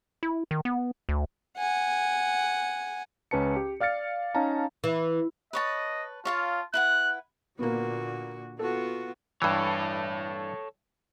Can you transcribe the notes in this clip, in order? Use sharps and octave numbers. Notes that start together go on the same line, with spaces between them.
E4
D#3
B3
D2
F#5 G#5
C#2 C#4 B4 A5 C#7
G4
D5 F5 F6 A6 C#7
C#4 D#4 F5 A5 A#5
E3
B4 C#5 D#5 A5
F4 C#5 F5 A5
E4 B4 F#5 F#6
A#2 D3 A#3 B3 F#4
B3 F4 F#4 A4
G2 E3 A4 C#5